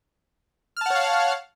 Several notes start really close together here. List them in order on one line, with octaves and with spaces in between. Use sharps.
F6 A5 F#5 C#5 F5